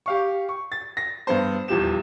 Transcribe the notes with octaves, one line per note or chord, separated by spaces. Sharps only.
G4 F5 C#6
C#6
A6
A#6
G2 B3 C5
D#1 E2 F3 G4 E7